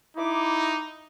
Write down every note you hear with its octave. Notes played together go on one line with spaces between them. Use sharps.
D#4 E4 D6